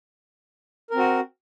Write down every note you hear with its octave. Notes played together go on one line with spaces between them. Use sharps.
C4 F#4 A#4